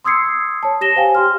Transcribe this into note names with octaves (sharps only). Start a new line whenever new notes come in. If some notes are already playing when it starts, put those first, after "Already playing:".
C6 D#6 E6 G#6 C7 C#7
C#5 A5
G4 A#6 E7 G7
C5 F5 G5 G#5
G4 G5 C6 F6